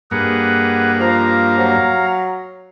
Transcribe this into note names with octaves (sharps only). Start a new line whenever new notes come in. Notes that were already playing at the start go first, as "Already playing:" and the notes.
G2 A#3 G#4 B4 F#5
F3 F5 A#5
F#3